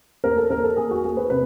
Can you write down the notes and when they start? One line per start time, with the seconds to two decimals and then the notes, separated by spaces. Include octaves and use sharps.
0.24 A#3 A#4
0.37 A4
0.50 A#3 A#4
0.64 A4
0.76 A#3 G#4
0.91 F#4
1.04 A#3 G#4
1.17 B4
1.30 C3 B4